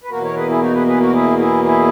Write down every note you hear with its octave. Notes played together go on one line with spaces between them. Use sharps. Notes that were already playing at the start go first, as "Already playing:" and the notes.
B4
E2 B2 A#3 F#4 A#4
A#4 C#5
G#4 B4
E4 G#4
D#4 F#4
G#4 B4
G#4 B4
F#4 A#4
E4 G#4
E4 G#4
E4 G#4